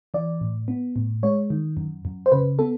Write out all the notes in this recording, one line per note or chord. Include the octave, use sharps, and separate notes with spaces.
E3 D5
A2
B3
A2
G#3 C#5
D#3
F#2
F#2
C5
C#3 B4
B3 A4